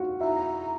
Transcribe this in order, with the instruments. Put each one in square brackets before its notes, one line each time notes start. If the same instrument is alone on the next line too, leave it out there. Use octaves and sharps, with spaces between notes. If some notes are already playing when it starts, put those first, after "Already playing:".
Already playing: [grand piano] F4 F#4 F#5
[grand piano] E4 E5 [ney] A#5